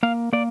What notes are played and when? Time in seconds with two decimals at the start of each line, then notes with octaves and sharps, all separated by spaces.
0.03 A#3 F5
0.33 A#3 D5